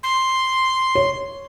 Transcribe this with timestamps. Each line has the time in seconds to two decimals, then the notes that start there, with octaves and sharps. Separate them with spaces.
0.03 C6
0.95 C#5